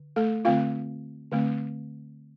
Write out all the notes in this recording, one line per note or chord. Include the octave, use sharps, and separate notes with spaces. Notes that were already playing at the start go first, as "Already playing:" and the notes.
Already playing: D3
A3 A4
D3 A3 C4 F4 F5
D3 A3 C4